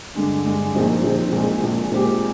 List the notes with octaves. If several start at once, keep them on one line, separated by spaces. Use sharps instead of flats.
G2 D3 G#3 D4
G2 D3 G#3 D4
A#1 A#2 F3 C4 D#4
A#1 A#2 F3 C4 D#4
A#1 A#2 G#3
A#1 A#2 G#3
A#2 G#3 C4 G4